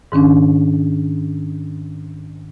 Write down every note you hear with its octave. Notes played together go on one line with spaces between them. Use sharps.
G#2 D#3 C#4 D4